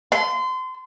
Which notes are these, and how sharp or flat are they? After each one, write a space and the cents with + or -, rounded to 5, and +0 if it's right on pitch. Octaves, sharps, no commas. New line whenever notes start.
C6 -30